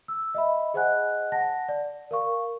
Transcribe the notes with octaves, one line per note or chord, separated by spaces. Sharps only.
E6
D#5 E5 B5
G#4 C5 D#5 F#5 G#5 F#6
F#5 A5 A#6
D5
A#4 F5 C#6